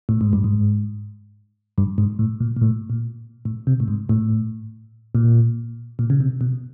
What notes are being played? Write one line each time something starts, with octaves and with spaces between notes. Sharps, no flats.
A2
G#2
G2
G#2
G2
G#2
A2
A#2
A#2
A2
A#2
A2
C3
A2
G#2
A2
A#2
A#2
C#3
C3
B2